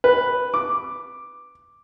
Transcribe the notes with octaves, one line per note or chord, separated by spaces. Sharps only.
B4
D6